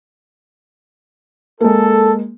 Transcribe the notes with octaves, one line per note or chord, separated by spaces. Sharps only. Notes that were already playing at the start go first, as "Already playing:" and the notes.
G#3 A#3 A4